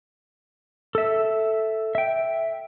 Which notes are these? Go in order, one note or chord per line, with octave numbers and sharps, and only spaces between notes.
A4 E5
E5 G5